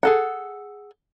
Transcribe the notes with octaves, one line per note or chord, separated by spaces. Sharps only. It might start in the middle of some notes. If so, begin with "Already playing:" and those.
G#4 A4 F#5